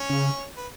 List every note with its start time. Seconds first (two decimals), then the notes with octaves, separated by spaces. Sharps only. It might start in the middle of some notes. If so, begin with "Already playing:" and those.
Already playing: C#4 C#5
0.10 C#3
0.57 B4